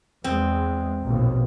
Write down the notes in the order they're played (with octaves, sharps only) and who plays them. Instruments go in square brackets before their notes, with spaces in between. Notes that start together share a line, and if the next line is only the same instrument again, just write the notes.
[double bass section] E2 G#3 [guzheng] C4
[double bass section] A#1 D#2 B2